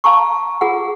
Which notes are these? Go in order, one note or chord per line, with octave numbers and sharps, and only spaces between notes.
F5 A5 A#5 C#6
F4 G#4 F#5